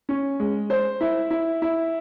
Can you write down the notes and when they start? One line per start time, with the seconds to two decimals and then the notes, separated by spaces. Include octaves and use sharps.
0.09 C#4
0.40 G#3
0.70 C5
1.01 E4
1.31 E4
1.62 E4